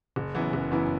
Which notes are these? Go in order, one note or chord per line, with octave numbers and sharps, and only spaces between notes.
F#1
F#2 E3 B3 E4
F#1
F#2 E3 B3 E4